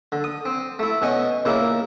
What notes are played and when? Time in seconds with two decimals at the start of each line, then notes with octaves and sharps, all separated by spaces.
0.12 D3
0.24 D#6
0.45 C4
0.79 A3 E4
1.02 B2 C#4 D#5 C#6
1.45 A#2 C#3 A#3 E4